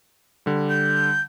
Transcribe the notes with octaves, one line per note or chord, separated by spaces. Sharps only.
D3 G3
G6